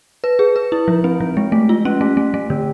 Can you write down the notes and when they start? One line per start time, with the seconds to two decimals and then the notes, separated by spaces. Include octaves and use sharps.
0.24 B4
0.39 G#4
0.56 B4
0.72 E4
0.88 F3
1.04 C4
1.20 F3
1.37 G#3
1.52 A3
1.69 F4
1.85 C#4
2.01 A3
2.17 A3
2.34 A3
2.50 D3